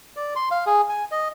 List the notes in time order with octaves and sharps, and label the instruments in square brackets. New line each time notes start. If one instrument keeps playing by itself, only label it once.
[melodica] D5
C6
F5
G#4
G#5
D#5